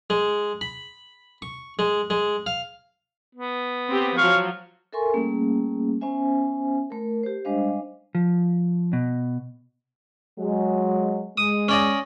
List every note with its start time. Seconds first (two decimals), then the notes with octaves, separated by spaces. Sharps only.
0.10 G#3
0.61 B5
1.42 C#6
1.79 G#3
2.10 G#3
2.46 F5
3.35 B3
3.88 C4 G4
4.18 F3 F#3 F5 C#6
4.93 A4 A#4 E5 G#5 C6 C#6
5.13 G3 A3 A#3 C#4 G#4
6.01 B3 C#4 C5 E5 G#5
6.90 A3 A#4
7.23 G4 C5
7.45 G3 G#3 D4 C5 D#5 F5
8.15 F3
8.93 B2
10.39 F#3 G#3
11.37 G#3 D#6
11.68 C#4 D5 D#5